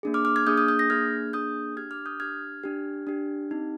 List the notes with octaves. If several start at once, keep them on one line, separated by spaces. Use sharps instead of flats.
A#3 D4 G#4
D6 F6
D6 F6
F6 G#6
A#3 D4 G#4 D#6 G6
D#6 G6
D#6 G6
G6 A#6
A#3 D4 G#4 F6 G#6
A#3 D4 G#4 D#6 G6
D4 G4 F6 G#6
D6 F6
D#6 G6
D4 G4 F6 G#6
D4 G4
D4 G4
C4 D#4 G4